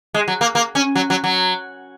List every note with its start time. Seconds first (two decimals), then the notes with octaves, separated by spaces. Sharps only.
0.14 G#3
0.28 F#3
0.41 A#3
0.55 A#3
0.75 C#4
0.95 F#3
1.10 F#3
1.24 F#3